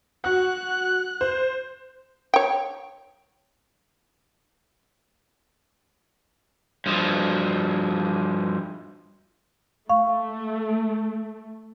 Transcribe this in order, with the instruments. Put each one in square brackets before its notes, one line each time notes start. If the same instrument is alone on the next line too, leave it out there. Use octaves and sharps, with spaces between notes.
[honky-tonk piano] F#4 F#5 [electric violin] F#6
[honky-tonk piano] C5
[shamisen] C#5 G5
[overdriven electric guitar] G2 F3
[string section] A3 [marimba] F5 C#6